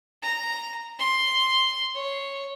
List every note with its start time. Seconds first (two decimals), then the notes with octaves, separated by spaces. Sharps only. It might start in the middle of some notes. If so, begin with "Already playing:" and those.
0.22 A#5
0.99 C6
1.95 C#5